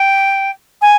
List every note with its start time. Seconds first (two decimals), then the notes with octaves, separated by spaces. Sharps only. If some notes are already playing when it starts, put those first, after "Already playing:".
Already playing: G5
0.82 G#5